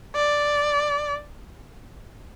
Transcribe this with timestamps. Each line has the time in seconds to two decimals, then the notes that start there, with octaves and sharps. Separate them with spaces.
0.16 D5